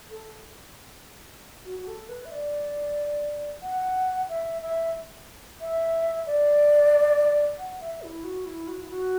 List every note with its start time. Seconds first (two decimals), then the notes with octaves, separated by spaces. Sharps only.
0.11 A4
1.65 F#4
1.79 F#4
1.87 A4
2.09 B4
2.25 E5
2.31 D5
3.62 F#5
4.29 E5
4.62 E5
5.61 E5
6.26 D5
7.58 F#5
7.80 E5
8.02 E4
8.24 F#4
8.46 E4
8.67 F#4
8.82 E4
8.90 F#4